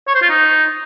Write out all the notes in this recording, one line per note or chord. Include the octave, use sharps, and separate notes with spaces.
C#5
C5
F4
D#4